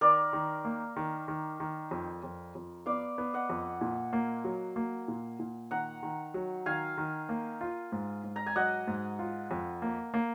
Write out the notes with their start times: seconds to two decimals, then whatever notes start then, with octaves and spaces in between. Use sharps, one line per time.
0.01 D#3 A#4 D5
0.33 D#3
0.65 A#3
0.96 D#3
1.28 D#3
1.60 D#3
1.91 F2
2.23 F2
2.55 F2
2.86 B3 D5 F5
3.18 B3
3.34 D#5 F#5
3.50 F2
3.81 A#2
4.13 A#3
4.44 F#3
4.76 A#3
5.08 A#2
5.39 A#2
5.71 D#3 F#5 A#5
6.03 D#3
6.34 F#3
6.66 D#3 F5 G#5
6.98 D#3
7.29 A#3
7.61 F4
7.92 G#2
8.24 G#2
8.36 A#5
8.46 G#5
8.56 F#3 D#5 F#5
8.88 G#2
9.19 F4
9.51 F2
9.82 A#3
10.14 A#3